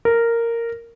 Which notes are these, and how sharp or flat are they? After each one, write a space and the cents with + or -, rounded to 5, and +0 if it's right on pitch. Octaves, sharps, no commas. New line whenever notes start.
A#4 -10